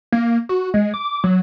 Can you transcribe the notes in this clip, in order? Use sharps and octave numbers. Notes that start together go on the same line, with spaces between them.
A#3
F#4
G#3
D6
F#3